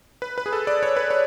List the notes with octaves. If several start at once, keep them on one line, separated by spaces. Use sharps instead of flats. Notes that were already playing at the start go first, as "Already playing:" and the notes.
B4
B4
G#4
A4
D5
C#5
B4
C#5